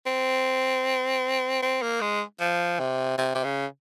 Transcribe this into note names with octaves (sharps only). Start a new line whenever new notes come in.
C4
C4
A#3
G#3
F3
C3
C3
C3
C#3